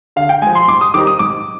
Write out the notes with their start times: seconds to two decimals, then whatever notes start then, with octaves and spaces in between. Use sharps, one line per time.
0.16 D3 F5
0.29 G5
0.42 F3 G#3 G#5
0.55 C6
0.68 G#2 D6
0.81 D#6
0.94 D#3 G3 C4 D#4 D6
1.07 D#6
1.19 G#2 D6